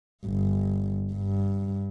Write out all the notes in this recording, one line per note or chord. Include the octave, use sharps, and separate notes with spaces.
G1
G2